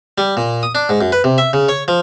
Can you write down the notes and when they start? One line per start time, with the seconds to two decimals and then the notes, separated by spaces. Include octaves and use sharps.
0.18 G3
0.37 A#2
0.63 D#6
0.75 D4
0.89 G#2
1.01 F#2
1.12 B4
1.24 C3
1.38 E5
1.53 C#3
1.69 C#5
1.88 F3